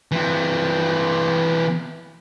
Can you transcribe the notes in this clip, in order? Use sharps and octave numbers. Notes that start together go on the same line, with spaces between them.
E3 C4